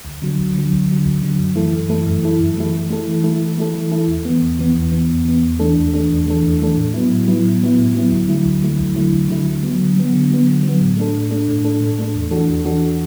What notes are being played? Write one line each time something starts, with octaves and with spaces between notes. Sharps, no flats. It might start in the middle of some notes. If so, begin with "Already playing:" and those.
D2
D3 F#3
D2
D3 F#3
D2
D3 F#3
D2
D3 F#3
F#2
E3 A3 E4 A4
F#2
E3 A3 E4 A4
F#2
E3 A3 E4 A4
F#2
E3 A3 E4 A4
E3
A3 E4 A4
E3
A3 E4 A4
E3
A3 E4 A4
E3
A3 E4 A4
E2
E3 B3
E2
E3 B3
E2
E3 B3
E2
E3 B3
E2
E3 A3 D4 A4
E2
E3 A3 D4 A4
E2
E3 A3 D4 A4
E2
E3 A3 D4 A4
A2
F#3 B3 E4
A2
F#3 B3 E4
A2
F#3 B3 E4
A2
F#3 B3 E4
D2
D3 F#3 A3 E4
D2
D3 F#3 A3 E4
D2
D3 F#3 A3 E4
D2
D3 F#3 A3 E4
D3
F#3 B3
D3
F#3 B3
D3
F#3 B3
D3
F#3 B3
A2
A3 D4 A4
A2
A3 D4 A4
A2
A3 D4 A4
A2
A3 D4 A4
E2
E3 D4 F#4 A4
E2
E3 D4 F#4 A4